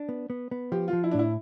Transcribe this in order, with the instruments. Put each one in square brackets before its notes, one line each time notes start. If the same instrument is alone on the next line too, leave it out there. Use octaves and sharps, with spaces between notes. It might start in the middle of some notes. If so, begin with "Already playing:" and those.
Already playing: [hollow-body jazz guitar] D4
B3
B3
B3
[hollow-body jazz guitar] F3 [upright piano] G4
[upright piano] F4
[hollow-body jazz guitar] F3
[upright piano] E4
D4
[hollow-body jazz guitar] A2 [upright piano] E4